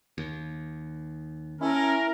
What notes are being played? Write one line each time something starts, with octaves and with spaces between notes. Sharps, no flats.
D#2
C#4 E4 A#4 E5 A5